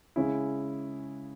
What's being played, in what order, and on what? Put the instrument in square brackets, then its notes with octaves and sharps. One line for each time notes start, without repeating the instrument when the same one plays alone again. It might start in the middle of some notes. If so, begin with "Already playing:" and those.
[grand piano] C#3 G#3 C#4 E4